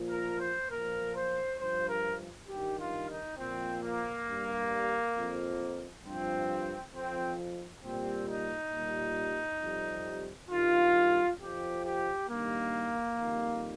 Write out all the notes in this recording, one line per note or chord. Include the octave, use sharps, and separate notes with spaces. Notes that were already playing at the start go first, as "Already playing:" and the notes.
Already playing: A#2 F3
A#4
C5
A#2 F3 A#4
C5
G2 F3 C5
A#4
G2 D#3 G3 G4
F4
D#4
A#2 F3 C4
A#3
G2 G3
F2 F3
G2 F3 C4
F2 F3 C4
A#2 G3 C4
D#4
A#2 G3
F2 C3 G3
G2 D#3 G3 F4
F2 F3 G4
G4
G2 D#3 G3 A#3
F2 D#3 G3